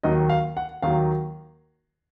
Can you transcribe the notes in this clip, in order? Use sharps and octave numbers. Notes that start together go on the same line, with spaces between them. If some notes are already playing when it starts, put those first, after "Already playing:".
D#2 D#3 F#3 D#5
F5
F#5
D#2 D#3 F#3 F5